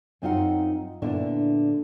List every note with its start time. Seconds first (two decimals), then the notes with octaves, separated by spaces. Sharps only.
0.22 F#2 C4 D#4 F4 F5 F#5
1.02 A#2 D3 B3 D4 E4